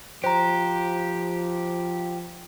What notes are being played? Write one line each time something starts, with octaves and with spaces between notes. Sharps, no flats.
F3 G4 C5 A#5